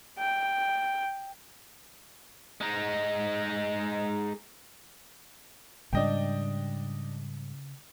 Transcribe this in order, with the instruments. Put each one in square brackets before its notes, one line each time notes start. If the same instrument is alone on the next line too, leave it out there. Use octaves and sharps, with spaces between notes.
[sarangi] G5
[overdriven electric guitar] G#3 D#4
[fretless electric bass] G#2 G3 [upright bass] C#3 [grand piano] D4 D#5 G5